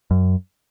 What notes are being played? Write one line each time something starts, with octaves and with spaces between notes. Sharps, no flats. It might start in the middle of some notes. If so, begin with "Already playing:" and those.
F#2